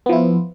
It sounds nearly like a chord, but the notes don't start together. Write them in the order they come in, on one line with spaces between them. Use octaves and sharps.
B3 F3 E4 F4